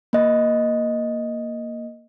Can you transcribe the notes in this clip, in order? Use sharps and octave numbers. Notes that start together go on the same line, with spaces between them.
A#3 D#5